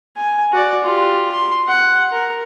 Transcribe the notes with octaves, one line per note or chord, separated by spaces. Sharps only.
G#5
F#4 D5
F4 G4
C6
F#5
A#4